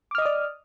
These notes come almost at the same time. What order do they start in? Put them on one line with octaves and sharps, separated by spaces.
D6 F6 D#5 D#6 D5